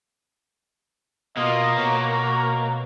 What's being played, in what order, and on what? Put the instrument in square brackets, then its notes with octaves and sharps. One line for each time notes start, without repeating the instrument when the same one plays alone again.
[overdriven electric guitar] B2 [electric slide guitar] A#3 [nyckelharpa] F4 [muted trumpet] D#5
[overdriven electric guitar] B2 [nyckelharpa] F#4 A#5 [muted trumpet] C#5